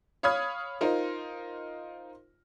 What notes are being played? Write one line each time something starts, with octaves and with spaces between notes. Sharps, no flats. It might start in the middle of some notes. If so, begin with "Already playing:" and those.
C#5 F5 B5 D#6 F6 G#6
D#4 F4 A#4 C5